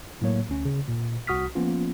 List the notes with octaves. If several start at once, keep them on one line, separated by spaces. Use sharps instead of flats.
A2 F#3 A#3 C#5
D2 C#4
C#3
A#2
C2 F#4 D#6 F6 B6
F3 A#3 B3 C#4 F4